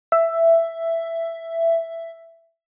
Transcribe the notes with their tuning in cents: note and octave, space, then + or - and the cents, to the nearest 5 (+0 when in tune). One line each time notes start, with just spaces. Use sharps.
E5 +10